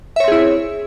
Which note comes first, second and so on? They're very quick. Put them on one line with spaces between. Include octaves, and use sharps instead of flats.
E5 C#5 C4 G#4 E4